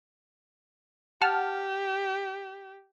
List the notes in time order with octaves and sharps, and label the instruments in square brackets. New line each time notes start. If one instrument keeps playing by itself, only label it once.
[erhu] G4 [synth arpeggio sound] F#5 A5 F6